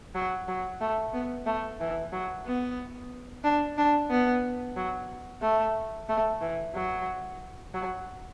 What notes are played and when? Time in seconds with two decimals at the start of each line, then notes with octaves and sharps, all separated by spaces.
0.15 F#3
0.48 F#3
0.81 A3
1.14 B3
1.46 A3
1.80 E3
2.13 F#3
2.46 B3
3.44 D4
3.78 D4
4.10 B3
4.76 F#3
5.42 A3
6.09 A3
6.41 E3
6.75 F#3
7.74 F#3